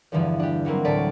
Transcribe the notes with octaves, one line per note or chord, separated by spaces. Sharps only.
E2 G2 D3 E3 F3
D4 G4
E3 F#3 G3 A#3 C4
D2 A2 D5 A5 B6 D7